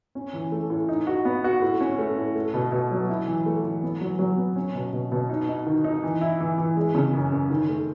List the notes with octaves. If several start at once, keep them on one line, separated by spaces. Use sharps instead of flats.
C#4
E3
A3
A2
D#4
F#4
B3
F#4
A2
C#4
A3
A2
A3
B2
B2
F#3
E4
E3
A3
E3
B3
F#3
F#3
B3
C#4
B2
B2
B2
D#4
D#4
D#3
D#4
E3
E4
E3
E3
G#3
C#3
F#2
F#2
D#3
A3